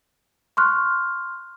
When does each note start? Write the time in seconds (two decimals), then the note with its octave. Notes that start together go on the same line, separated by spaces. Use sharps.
0.57 C6 C#6 F6 F#6